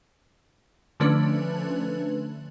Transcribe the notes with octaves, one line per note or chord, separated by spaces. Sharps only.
D3 F3 A3 C#4 D4 B4